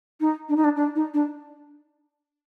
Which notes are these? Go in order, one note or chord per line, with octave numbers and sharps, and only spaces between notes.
D#4
D4
D#4
D4
D4
D#4
D4